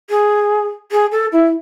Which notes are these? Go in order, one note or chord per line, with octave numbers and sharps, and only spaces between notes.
G#4
G#4
A4
E4